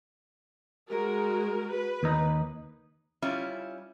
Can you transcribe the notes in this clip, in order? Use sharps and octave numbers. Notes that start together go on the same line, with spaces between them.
G#3 F#4 A#4
B4
D#2 D#4
G3 C#4 E4 F4